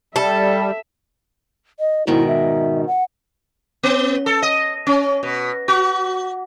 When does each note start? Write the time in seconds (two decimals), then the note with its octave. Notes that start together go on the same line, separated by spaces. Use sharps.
0.16 G3 A4 E5
1.80 D#5
2.07 G#2 B2 D#3 E4
2.28 E5
2.87 F#5
3.83 B3
4.26 A4
4.42 D#5
4.87 C#4
5.23 B2
5.68 F#4